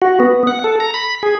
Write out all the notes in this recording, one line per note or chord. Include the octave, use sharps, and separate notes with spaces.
F#4
B3
F#5
A4
A#5
B5
G#4